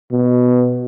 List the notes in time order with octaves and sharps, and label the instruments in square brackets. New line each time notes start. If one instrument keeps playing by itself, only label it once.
[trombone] B2